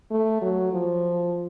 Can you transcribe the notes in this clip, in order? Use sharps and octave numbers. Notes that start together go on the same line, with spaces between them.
A3
F#3
F3